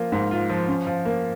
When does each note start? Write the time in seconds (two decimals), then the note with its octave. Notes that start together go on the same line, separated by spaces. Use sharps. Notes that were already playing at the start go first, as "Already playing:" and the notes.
Already playing: F3 A#3 F4
0.12 G#2
0.31 F4
0.50 F3
0.68 C#4
0.87 F3
1.05 A#3